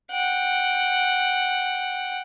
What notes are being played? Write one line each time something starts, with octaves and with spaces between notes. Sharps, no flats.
F#5 G5